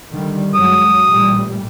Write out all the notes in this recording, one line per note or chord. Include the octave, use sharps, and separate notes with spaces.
D3 D#3 G3
F#2 F#3 G#3 D#6
A1 A#2 G3